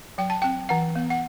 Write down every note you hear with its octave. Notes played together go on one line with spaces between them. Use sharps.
F#3 G5
A5
C4 G5
E3 F#5
B3
F#5